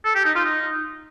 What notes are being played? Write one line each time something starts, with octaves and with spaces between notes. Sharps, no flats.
A4
G4
D#4
F4
D#4